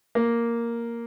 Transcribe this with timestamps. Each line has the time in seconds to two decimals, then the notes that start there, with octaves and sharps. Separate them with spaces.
0.15 A#3